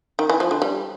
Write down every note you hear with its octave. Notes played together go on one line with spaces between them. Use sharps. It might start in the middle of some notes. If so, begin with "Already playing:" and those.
D#3
E3
F3
D3
G3